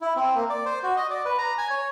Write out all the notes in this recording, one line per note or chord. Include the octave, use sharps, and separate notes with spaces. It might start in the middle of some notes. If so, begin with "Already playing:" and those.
E4
C4
A#3
D5
C5
F#4
D#5
D5
B4
A#5
G#5
C#5